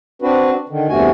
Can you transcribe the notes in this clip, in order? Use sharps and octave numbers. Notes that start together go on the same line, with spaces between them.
C4 D4 F#4 B4
D3 D#3
E2 G2 C3 A3 F#4 G#5